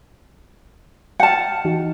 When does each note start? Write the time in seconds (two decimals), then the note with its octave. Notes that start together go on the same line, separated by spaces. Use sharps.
1.20 F#5 G5 A5 F6
1.65 E3 D#4 F#4